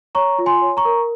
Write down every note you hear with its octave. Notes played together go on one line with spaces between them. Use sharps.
C#5 A#5 C#6
F4
G#5 C6
C#5
A#5 C#6
A#4